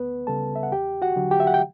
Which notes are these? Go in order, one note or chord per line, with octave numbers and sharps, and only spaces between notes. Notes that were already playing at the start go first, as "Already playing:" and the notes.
Already playing: D2 B3 B4
C#3 G3 A4 A5
E5
F#5
E2 G4 G5
F#4 F#5
D3 F#3
G4 G5
E5
F#5
G5